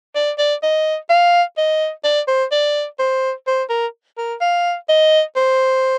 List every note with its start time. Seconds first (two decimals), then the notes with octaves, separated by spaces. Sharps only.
0.15 D5
0.38 D5
0.63 D#5
1.09 F5
1.57 D#5
2.04 D5
2.28 C5
2.52 D5
2.99 C5
3.47 C5
3.70 A#4
4.18 A#4
4.41 F5
4.89 D#5
5.36 C5